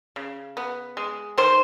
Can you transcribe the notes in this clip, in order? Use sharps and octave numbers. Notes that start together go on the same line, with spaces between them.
C#3
B3
G#3
D#3 C5